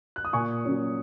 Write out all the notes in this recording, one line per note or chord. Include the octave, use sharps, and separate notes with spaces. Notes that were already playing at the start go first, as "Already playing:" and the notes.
F#6
D#6
A#2 G#5 C#6
F#3 C#4